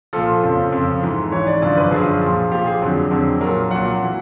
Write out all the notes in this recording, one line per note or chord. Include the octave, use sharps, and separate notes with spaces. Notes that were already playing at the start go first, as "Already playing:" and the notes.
A#2 F3 A4
F2 C#3 F3
F2 C#3 F3
G#2 E3
G#2 E3 C#5
D5
F#2 D3 F3 D5
B4
F#2 D3 F3 G#4
A#2 F3
A#2 F3 G4
G#4
F2 D3 F#3
F2 D3 F#3
A#2 F#3 A#4
A#2 F#3 F#5
E3